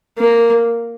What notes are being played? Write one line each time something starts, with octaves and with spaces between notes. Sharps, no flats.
A#3